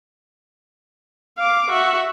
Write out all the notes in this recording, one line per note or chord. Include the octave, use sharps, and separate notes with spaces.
F5 D6
F#4 E5